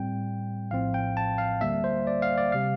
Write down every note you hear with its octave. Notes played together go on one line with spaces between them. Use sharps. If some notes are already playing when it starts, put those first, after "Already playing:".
Already playing: A2 G3 C4 G5
A#1 A2 F3 C4 F5
G5
A5
F5
D2 D3 G3 A#3 E5
C5
D5
F5
D5
C3 G3 F5